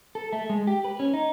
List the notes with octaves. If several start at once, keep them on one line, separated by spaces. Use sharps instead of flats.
A4
A3
G#3
G4
B4
C#4
D#4